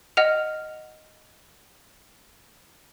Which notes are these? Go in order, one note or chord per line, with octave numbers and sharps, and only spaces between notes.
D#5 F#5 F6 F7